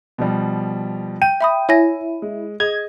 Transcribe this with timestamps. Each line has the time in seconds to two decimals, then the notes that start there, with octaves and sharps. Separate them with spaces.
0.18 B2 F3 G3
1.22 G5 D#7
1.41 E5 B5 D#6
1.69 E4 C#5 G#5 A#6
2.22 G#3
2.60 G#4 D#5 G#6